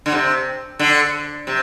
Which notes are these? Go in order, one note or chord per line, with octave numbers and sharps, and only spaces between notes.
D3
C3
D3
C3